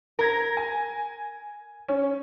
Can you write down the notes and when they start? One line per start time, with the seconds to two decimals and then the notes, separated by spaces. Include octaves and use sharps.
0.19 A#4 A#5 G#6 A#6
0.57 G#5
1.88 C#4